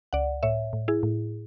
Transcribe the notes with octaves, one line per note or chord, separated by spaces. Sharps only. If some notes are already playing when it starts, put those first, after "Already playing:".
C#2 D5 F#5
A2 C#5 E5
A2
E4 G#4
A2